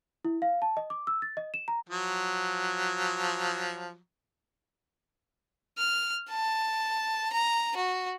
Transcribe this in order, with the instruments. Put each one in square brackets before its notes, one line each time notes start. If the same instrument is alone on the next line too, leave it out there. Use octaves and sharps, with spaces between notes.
[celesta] E4
F5
A5
D#5
D6
E6
A6
D#5
E7
A#5
[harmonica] F3 F#3
[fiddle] F6
A5
A#5
F#4